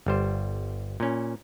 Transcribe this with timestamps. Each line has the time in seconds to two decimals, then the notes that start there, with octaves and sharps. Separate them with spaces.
0.06 G1 G3 C5
1.00 A#2 C#4